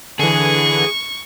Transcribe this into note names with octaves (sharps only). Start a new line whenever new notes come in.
D3 E3 G#4 C#6